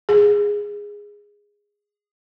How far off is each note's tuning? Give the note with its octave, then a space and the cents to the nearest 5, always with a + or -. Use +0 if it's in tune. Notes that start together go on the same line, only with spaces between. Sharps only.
G#4 -10